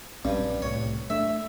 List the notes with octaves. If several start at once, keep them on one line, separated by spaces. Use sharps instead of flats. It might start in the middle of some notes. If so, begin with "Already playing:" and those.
A#1 G2 C4 C#4
C2 A2 C3 C#5
A3 D4 E5